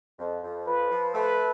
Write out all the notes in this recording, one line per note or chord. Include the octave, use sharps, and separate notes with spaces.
F2
F2
F3 B4
F3
A3 B4